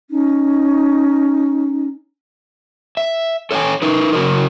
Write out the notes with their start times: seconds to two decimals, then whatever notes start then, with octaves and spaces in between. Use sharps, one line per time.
0.09 C#4 D#4
2.97 E5
3.51 A4 C#5 D#5 G5 G#5
3.82 D#4 A#4 B4
4.13 C#3 F#3 A#4